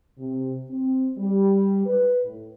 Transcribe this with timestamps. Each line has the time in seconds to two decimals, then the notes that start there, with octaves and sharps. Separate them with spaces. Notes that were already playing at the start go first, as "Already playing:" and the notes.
0.18 C3
0.69 C4
1.17 G3
1.85 B4
2.23 A2